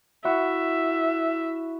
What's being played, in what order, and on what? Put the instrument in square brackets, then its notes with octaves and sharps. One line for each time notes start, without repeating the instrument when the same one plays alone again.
[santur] E4 F#4 [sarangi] E5